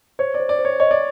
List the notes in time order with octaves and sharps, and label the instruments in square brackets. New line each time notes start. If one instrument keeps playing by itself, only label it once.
[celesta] C5 [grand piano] C#5
[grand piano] D5
[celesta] C5
[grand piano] D5
[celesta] C5
[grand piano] C#5
[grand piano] C#5 [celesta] D#5
[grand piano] D5